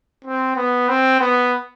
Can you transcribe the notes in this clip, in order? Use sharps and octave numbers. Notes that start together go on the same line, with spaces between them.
C4
B3
C4
B3